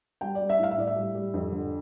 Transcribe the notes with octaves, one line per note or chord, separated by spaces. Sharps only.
G3 G5
G3 D5
E5
A2 F5
E5
A2 D5
E5
G3
G3
F2
D3